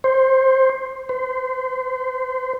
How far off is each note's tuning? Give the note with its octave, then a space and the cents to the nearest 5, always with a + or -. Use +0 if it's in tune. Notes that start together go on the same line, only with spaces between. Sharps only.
C5 +15
C5 -30